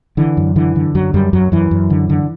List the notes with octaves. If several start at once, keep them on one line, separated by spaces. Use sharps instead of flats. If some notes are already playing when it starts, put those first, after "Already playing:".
D3 E3
F#2
D3 E3
D3
F#2 F#3
F#2 G3
F#2 F#3
F#2 E3
F#2
D3
D3